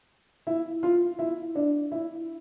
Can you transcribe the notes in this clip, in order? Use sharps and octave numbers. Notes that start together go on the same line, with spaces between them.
E4
F4
E4
D4
E4